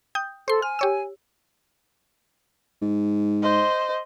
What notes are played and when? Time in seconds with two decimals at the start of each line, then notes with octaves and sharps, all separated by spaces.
0.15 G5 D#6 G6
0.48 A4 C5 C6
0.62 G#5 F6
0.79 G4 C#5 E6
2.82 G#2
3.42 C5 D#5